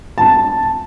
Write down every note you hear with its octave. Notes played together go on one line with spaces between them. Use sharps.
A5